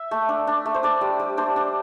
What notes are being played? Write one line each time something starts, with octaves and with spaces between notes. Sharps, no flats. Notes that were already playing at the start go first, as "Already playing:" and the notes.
Already playing: E5
A3
D4
D4
A3
C5
D4 D5
G3
G3
D4 C5
D4